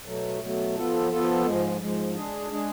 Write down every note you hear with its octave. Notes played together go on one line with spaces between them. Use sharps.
B2 F#3 A3
B2 F#3 A3
F3 B3 F4 A4
F3 B3 F4 A4
G#2 F3 G#3
G#2 F3 G#3
G#3 D4 G#4
G#3 D4 G#4